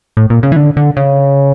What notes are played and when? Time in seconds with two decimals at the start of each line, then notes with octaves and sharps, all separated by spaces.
0.17 A2
0.30 A#2
0.43 C#3
0.52 E3
0.56 D3
0.77 D3
0.97 C#3